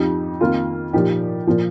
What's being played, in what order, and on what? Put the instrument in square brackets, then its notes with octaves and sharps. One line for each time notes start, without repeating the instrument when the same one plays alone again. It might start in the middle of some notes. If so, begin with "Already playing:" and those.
Already playing: [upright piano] F2 F3 D#4 G4
F2 D#3 A#3 F4
A#2 F3 D#4 G4
A#2 F3